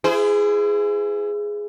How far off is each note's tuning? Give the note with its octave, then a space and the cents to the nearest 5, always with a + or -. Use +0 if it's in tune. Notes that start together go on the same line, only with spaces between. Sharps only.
E4 +30 G#4 +0 C5 -35